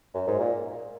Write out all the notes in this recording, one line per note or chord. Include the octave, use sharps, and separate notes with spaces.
F#2
G#2
A#2